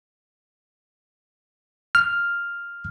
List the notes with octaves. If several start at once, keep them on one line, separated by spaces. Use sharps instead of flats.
F6